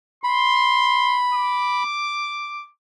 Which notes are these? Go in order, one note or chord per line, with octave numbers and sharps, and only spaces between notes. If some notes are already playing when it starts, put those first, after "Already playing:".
B5 C6
D6